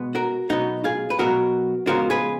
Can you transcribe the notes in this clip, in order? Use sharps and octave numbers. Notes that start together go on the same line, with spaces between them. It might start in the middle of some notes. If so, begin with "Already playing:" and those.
Already playing: B2 G#3 B3
F#4 A#4
B2 F#3 B3 D#4 F#4
F4 G#4
B4
B2 F#3 B3 F#4 A#4
C#3 F3 G#3 B3 F#4 A#4
G#4 B4